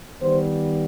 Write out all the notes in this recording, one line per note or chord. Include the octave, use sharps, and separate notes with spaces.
D#3 G3 B3 C5